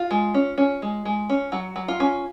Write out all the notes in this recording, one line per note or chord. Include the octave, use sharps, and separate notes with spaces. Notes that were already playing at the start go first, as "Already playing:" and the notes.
Already playing: F4
G#3
C#4
C#4
G#3
G#3
C#4
F#3 F#4
F#3
F4
C#4